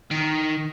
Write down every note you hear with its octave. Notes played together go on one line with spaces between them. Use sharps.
D#3